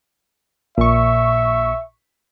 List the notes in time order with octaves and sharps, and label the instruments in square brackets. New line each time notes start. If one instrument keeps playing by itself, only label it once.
[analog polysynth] A#1 C#6 [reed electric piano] A#2 [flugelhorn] E5